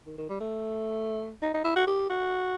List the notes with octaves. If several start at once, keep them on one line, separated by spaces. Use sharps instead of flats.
D#3
D#3
G3
A3
D#4
D#4
E4
F#4
G4
F#4